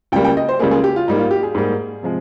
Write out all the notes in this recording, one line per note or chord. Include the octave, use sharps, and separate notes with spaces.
C#2 C#3 G3 A#3 G5
G5
D#5
C5
C#2 C#3 G3 A#3 G#4
G#4
G4
F4
G#2 G3 A#3 D#4
F4
G4
G#4
G#2 G3 A#3
C3 F3 G#3